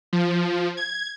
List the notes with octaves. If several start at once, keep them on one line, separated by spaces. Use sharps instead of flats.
F3
G#6